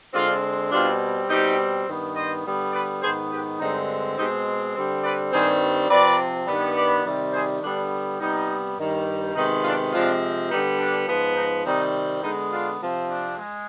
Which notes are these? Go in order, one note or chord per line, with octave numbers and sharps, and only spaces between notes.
D3 G#3 C4 D4 F4
B2 G3 C4 D4 F4
B2 G3 C4 D#4 G4
G2 D#3 B3
C5 D#5
D3 G3 B3
B4 D5
G#2 D#3 B3 G#4 C5
G4 B4
G2 D3 G#3 C4 D#4
B2 G#3 C4 D#4 G4
D3 G3 C4
B4 D5
G2 D#3 G3 C4 G#4 C5
C3 F3 C4 B4 D5
G2 D#3 G3 B3
B4 D5
C3 D#3 G3
G#4 C5
D3 G3 B3 D4
C3 G3 B3 D#4
G2 D#3 G3
C3 D#3 G#3 B3 D#4
D4 F4
C3 F3 G#3 C4 D4 F4
D3 G3 B3 D#4
D4
G#2 F3 B3
D#4
C3 D#3 G3 C4 D#4
D3 G#3 B3 D#4
D4 F4
C3 F3 C4
D4
G#3